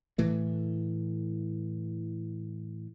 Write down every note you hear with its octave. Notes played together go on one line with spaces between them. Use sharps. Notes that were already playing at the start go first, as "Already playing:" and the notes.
A2 E3 A3